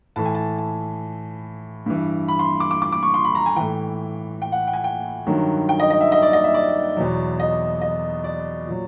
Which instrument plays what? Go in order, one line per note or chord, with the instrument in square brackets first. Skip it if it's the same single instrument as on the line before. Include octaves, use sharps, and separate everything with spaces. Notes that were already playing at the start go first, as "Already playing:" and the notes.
[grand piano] A2 E3 A5
G#5
A5
A5
G2 E3
B5
C6
D6
D6
D6
D6
C#6
C6
B5
A#5
G#5
A2 E3 G5
G5
F#5
G5
G#5
G5
G2 D#3 F#3
G5
D#5
D#5
E5
D#5
D5
D#5
E5
D5
E2 B2 F#3
D#5
D#5
D5
A#2 F#3